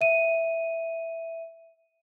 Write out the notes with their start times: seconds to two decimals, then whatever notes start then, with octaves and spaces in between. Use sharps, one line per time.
0.01 E5 D#7